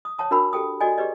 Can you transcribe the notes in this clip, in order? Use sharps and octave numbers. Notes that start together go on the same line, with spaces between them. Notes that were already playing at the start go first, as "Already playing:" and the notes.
D#6
C#5 F#5 A5 D#6
D4 F#4 A#4 F#5 B5 E6
G4 A4 G5 D#6
F#4 A4 D5 D#5 G#5
G4 G#4 B4 D5 D#5